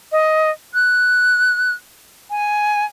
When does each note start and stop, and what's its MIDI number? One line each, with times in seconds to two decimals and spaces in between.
0.12 0.50 75
0.74 1.74 90
2.30 2.85 80